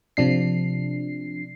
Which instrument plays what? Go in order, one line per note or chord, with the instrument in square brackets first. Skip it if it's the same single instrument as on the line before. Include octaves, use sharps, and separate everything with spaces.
[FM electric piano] C3 F3 D4 C7